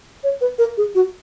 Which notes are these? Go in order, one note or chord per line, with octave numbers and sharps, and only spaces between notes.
C#5
B4
A#4
G#4
F#4